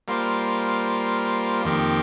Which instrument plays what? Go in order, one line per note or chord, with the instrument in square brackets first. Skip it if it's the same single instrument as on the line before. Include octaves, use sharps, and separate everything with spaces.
[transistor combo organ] G3 A#3 F4 C5
F2 D#3 A#3 G4